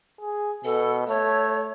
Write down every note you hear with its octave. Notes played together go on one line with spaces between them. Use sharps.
G#4
B2 A4
A3 C#5